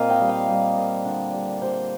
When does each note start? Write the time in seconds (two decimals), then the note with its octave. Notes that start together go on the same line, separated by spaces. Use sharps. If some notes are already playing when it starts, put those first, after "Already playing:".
Already playing: A#2 A#3 C4 D#5 F5
0.10 G5
0.20 G3
0.29 F5
0.48 G3
0.77 A#2
1.05 D3
1.33 G3
1.62 G3 C5